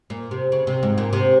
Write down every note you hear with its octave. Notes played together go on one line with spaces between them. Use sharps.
A#2
C3
C#3
C3
G#2
A#2
C3